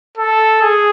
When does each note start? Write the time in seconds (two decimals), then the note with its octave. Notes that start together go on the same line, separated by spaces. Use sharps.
0.17 A4
0.62 G#4